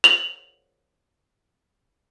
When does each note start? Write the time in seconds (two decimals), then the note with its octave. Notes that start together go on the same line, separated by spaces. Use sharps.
0.04 F7 F#7